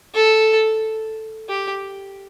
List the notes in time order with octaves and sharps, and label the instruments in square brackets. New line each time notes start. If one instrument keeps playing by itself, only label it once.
[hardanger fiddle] A4
G4